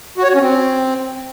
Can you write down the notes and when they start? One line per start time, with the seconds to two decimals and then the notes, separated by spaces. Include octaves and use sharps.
0.18 F#4
0.23 C#5
0.29 F#4
0.35 C#4
0.40 C4